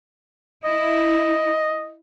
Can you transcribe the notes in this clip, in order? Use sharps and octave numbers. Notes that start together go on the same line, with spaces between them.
E4 D#5